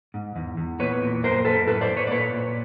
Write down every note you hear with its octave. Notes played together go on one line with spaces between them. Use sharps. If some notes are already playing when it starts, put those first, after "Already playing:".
G#2
E2
E2
A#2 B4 C#5
A#2
F#2 A#4 C5
F#2 A4 B4
A2 A4 B4
C5 D5
A2
B4 C#5
D5
A#2 B4 C#5
A#2